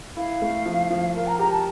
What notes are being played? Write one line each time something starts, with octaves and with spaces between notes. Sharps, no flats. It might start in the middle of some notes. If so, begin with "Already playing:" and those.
E4 F5
A3
F3
F3
A#4 F5
A#5
G4 A#5
A5